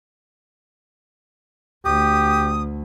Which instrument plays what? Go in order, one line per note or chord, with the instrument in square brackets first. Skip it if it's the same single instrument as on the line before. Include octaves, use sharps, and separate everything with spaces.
[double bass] D2 [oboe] G4 [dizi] D#6